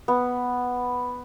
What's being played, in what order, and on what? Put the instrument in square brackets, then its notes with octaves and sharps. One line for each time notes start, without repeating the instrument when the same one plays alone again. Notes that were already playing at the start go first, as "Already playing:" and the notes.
[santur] B3